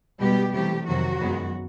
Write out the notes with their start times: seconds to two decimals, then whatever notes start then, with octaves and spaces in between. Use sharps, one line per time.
0.19 B2 G3 G#3 B3 G4
0.53 C3 E3 G3 A3 G4
0.86 F2 C3 D#3 F#3 F#4
1.20 F#2 D#3 G#3 B3